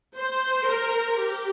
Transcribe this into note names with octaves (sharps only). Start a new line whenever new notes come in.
C5
A#4
G4